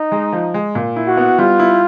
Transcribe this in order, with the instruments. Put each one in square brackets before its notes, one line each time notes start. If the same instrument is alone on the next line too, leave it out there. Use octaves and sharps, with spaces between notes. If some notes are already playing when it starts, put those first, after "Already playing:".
Already playing: [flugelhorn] D#4
[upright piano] G#3
F3
G#3
A#2
E4
[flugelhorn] F#4
[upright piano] B3
[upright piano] G3 [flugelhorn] F4
[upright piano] E4